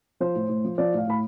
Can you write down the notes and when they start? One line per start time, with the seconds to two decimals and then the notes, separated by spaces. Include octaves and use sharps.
0.20 F3 C5
0.35 A2
0.49 A2
0.64 F3
0.78 F3 D5
0.94 A2 F5
1.07 A2 B5